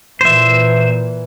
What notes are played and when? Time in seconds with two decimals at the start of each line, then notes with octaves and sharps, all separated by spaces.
0.21 A#2 E3 C5 E5